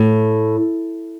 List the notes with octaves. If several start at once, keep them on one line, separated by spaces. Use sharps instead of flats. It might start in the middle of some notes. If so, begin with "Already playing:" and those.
Already playing: A2